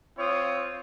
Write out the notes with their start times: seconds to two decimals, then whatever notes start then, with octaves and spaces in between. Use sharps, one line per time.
0.18 C4 F4 C#5 D#6